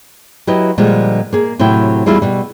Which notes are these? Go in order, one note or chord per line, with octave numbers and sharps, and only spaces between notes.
F#3 E4 G4 B4 D#5
A#2 D3 F3 G3 G#3
A#3 G#4
A2 C3 F#3 E4 G5
E2 G3 E4 F4 G#4 D5
B2 G3